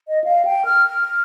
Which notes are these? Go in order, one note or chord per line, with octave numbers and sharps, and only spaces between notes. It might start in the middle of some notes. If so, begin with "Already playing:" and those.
D#5
F5
G5
F6
F6